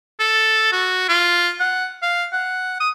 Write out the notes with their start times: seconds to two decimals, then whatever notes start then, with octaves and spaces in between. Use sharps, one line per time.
0.19 A4
0.72 F#4
1.09 F4
1.60 F#5
2.02 F5
2.33 F#5
2.80 D#6